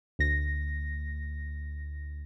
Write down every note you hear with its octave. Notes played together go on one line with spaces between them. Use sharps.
D2 A#6